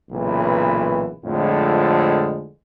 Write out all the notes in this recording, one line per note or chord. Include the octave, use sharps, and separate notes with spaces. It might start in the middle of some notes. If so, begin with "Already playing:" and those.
B1 A#2 C#3 E3
F2 A2 D3 F3 G#3